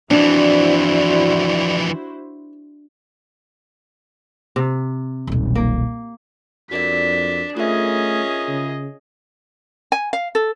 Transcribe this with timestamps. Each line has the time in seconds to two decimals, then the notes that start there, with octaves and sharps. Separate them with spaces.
0.11 F2 E3 D4 E4 F#4 C5 D5
4.56 C3
5.27 D#1 B1
5.55 A#3
6.71 F2 D4 F#4 A#4 D5 B6
7.57 A3 C#4 F4 G#4 A#4 D#5 E5
8.48 C#3
9.92 G#5
10.13 F5
10.35 A4